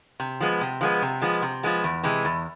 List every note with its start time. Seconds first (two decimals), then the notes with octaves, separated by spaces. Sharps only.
0.20 C3
0.40 F3 G#3 B3
0.61 C3
0.81 F3 G#3 B3
1.02 C3
1.22 F3 G#3 B3
1.42 C3
1.63 F3 G#3 B3
1.84 E2
2.03 C3 E3 G#3
2.25 E2